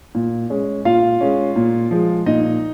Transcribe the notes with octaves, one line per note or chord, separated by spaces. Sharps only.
A#2
G#3 C#4
A#2 F4 F5
G#3 C#4
A#2
F3 G#3
A#2 D#4 D#5